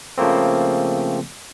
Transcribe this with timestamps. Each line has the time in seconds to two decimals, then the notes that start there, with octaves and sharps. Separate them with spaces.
0.18 C#3 F3 A3 A#3 C4